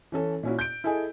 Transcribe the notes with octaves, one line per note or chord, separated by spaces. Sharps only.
E3 C#4 A4
A#2 C#4 E4 F#4
G6 D7
E4 G#4 A4 D#5 G#5